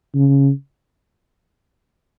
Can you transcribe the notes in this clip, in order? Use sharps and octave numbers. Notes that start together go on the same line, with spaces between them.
C#3